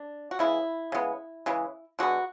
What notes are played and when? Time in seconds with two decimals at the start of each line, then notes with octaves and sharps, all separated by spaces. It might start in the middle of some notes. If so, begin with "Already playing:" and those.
Already playing: D4
0.31 F#4
0.39 C#3 G#3 B3 E4
0.92 C#3 G#3 B3
1.46 C#3 E3 G#3
1.99 D3 G#3 B3 F#4